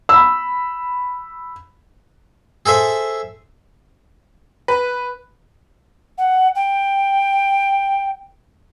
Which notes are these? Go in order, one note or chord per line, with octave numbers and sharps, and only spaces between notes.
B5 E6
G#4 A4 C5 E5
B4
F#5
G5